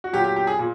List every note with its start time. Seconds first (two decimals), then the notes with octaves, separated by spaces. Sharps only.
0.04 F#4
0.13 A#2 F#3 G4
0.24 G4
0.36 G4
0.47 G#4
0.59 A#2